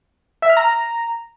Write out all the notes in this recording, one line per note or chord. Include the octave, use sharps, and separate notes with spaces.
E5
F6
A#5